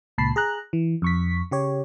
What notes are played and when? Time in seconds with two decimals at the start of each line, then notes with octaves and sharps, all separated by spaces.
0.18 C#2 A#2 A5 B5 C7
0.36 G#4 A#5 F#6
0.73 E3
1.02 F2 C#6 B6
1.51 C#3 G4 C#5